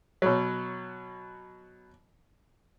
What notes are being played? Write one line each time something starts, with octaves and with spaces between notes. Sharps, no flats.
B2 F#3